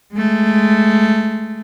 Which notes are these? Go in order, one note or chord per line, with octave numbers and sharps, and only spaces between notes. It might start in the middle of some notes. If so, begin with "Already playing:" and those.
G#3 A3